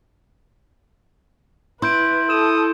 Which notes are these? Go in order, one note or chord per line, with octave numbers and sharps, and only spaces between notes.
E4 B4 C6 G6 D7
A4 D#6 E7